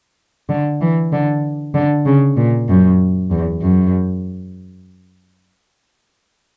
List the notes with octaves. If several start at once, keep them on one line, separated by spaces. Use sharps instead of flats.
D3
E3
D3
D3
C#3
A#2
F#2
E2
F#2